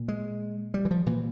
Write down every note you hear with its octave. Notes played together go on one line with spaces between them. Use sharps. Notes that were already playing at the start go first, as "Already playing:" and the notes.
Already playing: A#2
G#3
G3
E3
F3
A#2 E3